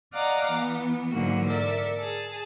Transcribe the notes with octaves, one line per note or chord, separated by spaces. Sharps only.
D5 D#5 F5 F#5 A#5 D6
E3 B3
G#2 D3 E3 F#3 A#3 F#4
A4 A#4 D5 E5
G#4 A5